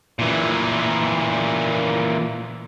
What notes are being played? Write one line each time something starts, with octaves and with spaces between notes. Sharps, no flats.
A#2 E3